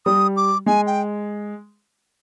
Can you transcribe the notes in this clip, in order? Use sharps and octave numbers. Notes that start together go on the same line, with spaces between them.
G3 D#6
D6
G#3 G#5
G5